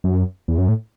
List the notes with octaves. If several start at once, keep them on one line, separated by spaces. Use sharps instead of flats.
F#2
E2
F#2
A2